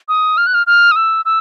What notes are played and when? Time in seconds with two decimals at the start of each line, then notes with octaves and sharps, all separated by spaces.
0.08 D#6
0.37 F6
0.46 F#6
0.54 F6
0.67 F6
0.91 D#6
0.96 E6
1.25 E6